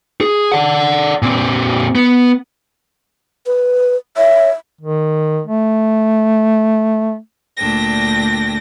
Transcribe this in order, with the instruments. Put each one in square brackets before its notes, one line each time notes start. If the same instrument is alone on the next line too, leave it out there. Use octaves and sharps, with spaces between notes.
[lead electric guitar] G#4
D5 F#5
A#2 C4
B3
[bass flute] B4
[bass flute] C#5 [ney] E5
[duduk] D#3
A3
[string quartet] D2 A#2 D4 G5 A#6